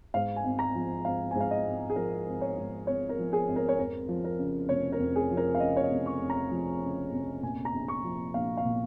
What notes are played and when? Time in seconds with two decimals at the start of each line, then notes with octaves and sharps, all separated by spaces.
0.14 G#2 F5
0.36 G#5
0.44 G#1
0.59 A#5
0.75 F3
1.05 G#1 F5
1.31 G#2 G#5
1.40 F5
1.51 D#5
1.65 G#1
1.90 G#4
1.96 F3 A#4
2.27 G#1
2.41 C#5
2.57 G#2
2.87 G#1 C#5
3.09 A#4
3.18 F3
3.33 G#4
3.48 G#1
3.56 A#4
3.69 C#5
3.78 F2 A#4
4.09 F3
4.24 A#4
4.39 C#3
4.69 F1 C#5
4.92 A#4
4.99 F2
5.16 G#4
5.31 F3
5.37 A#4
5.55 F5
5.60 C#3 D#5
5.77 C#5
5.83 D#5
5.91 F1
6.06 C#6
6.21 F2
6.30 A#5
6.51 F3
6.82 C#3
7.13 F1
7.42 A#2 G#5
7.65 A#5
7.74 A#1
7.88 C#6
8.04 F3
8.34 A#1 F5
8.57 F5
8.65 A#2